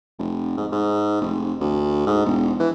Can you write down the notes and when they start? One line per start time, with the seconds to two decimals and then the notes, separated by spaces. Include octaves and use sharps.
0.19 F1
0.57 G#2
0.72 G#2
1.21 F1
1.60 D2
2.07 G#2
2.26 E1
2.60 E3